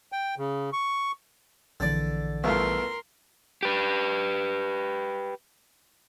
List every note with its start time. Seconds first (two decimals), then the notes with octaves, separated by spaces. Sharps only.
0.12 G5
0.38 C#3
0.73 C#6
1.80 A#1 D3 E3 D5
2.44 C2 B2 A3 F4 A#4 C6
3.63 G4 B4